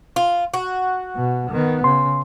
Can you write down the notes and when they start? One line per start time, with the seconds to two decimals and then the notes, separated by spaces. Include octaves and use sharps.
0.16 F4
0.54 F#4
1.15 B2
1.50 D#3 B3
1.84 C#3 C6